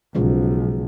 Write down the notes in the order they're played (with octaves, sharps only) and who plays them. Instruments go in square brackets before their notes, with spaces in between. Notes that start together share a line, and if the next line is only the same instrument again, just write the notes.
[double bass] B1 [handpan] C#3 F3 G#3